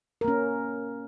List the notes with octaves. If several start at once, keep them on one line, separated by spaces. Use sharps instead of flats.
A#3 C#4 A#4